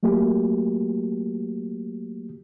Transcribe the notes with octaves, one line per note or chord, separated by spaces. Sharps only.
F#3 A3 A#3 F#4 G4